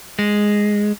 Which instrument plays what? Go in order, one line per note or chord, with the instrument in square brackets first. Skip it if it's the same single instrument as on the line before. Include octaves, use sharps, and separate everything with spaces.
[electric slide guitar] G#3